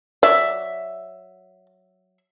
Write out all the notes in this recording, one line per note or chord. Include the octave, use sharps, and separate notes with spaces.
F#3 D5 E5